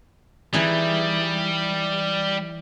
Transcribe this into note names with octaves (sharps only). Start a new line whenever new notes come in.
E3 G3 D#4 G#4